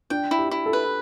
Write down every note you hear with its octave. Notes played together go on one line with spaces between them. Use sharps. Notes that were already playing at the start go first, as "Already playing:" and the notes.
D4 G5
E4
G4
E4
A4
B4